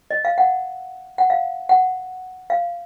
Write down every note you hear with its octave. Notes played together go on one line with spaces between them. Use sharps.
D#5
F5
F#5
F#5
F5
F#5
F5